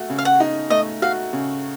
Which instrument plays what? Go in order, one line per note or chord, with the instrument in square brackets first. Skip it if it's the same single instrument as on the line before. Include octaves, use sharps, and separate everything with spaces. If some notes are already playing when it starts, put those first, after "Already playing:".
Already playing: [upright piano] A3 F#4
C#3
[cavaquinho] F5
F#5
[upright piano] D#4
[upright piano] A3 [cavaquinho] D#5
[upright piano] F#4 [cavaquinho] F5
[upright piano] C#3